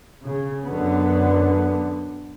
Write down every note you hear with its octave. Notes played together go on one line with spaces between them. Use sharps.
C#3
F#2 D3 B3